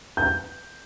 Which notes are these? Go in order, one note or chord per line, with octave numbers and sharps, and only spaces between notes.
G6